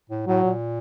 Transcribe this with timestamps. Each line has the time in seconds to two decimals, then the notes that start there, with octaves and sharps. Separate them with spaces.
0.10 A2
0.27 A2 F#3
0.44 A#2